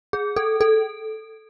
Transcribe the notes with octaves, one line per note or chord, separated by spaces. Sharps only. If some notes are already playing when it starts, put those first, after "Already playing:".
G#4
A4
A4